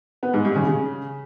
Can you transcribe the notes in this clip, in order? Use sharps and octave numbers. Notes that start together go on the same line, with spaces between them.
B3
G#2
G2
C#3
C#3